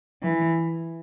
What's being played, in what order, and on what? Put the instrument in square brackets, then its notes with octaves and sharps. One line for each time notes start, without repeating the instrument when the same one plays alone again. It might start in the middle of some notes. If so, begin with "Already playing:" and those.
[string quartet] E3